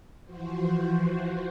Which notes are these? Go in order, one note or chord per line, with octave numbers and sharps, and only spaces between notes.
E3 F3 F#4 C5